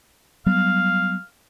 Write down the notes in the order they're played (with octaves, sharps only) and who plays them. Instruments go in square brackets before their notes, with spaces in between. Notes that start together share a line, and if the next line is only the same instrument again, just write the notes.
[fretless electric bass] F#3 G3 B3 [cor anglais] F5